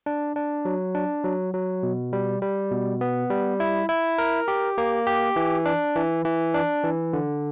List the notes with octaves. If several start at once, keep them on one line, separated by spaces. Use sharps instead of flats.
D4
D4
F#3
D4
F#3
F#3
B2
G3
G3
B2
B3
G3
E4
E4
A#4
G4
A#3
G4
E3
D4
E3
E3
D4
E3
D3